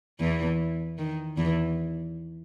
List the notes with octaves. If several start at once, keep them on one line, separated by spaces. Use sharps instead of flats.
E2 E3
D#3
E2 E3